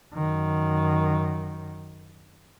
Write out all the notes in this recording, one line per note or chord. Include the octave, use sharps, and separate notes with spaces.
F#2 D#3